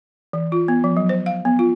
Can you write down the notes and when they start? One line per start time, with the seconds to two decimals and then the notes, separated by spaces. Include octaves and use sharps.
0.33 E3
0.52 F4
0.68 B3
0.84 F3
0.97 F#3
1.09 C5
1.26 F5
1.45 B3
1.59 F4